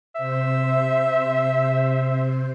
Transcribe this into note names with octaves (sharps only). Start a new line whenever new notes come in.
C3 C5 E5